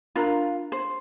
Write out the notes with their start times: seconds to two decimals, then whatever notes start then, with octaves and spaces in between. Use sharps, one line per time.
0.16 D4 F4 A#4 A#5
0.72 C5